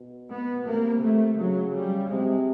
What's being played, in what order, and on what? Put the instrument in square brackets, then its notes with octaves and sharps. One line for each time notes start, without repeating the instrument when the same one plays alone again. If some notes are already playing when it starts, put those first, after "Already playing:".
Already playing: [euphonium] B2
[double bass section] B3
[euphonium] C3 [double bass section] A#3
[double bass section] A3
[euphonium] C#3 [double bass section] F#3
[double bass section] G3
[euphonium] C3 [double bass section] G#3